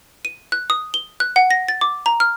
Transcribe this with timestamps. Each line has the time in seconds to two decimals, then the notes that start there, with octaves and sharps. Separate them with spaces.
0.25 D#7
0.52 F#6
0.70 D#6
0.94 G7
1.20 F#6
1.36 F#5
1.51 A#6
1.68 A6
1.81 D6
2.06 A#5
2.20 F6